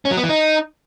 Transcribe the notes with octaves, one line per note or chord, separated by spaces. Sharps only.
C#4
F#3
B3
E3
D#4